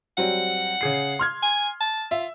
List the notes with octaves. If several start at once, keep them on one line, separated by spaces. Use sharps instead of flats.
F#3 G3 C4 F#5
C#3 G#4 C7
C6 F6 G#6
G#5
A5
F4 E5